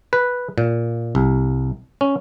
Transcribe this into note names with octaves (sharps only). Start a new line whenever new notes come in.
B4
A#2
C2
C#4